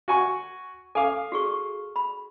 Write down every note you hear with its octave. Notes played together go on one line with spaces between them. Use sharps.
F#4 G#5 C#6
A4 F5 G#5 D6
F#4 G#4 C#6
B5